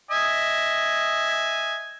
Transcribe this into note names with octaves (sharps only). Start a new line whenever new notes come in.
D#5 E5 G#5